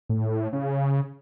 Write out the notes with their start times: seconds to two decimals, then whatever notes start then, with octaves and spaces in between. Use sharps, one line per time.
0.09 A2
0.53 C#3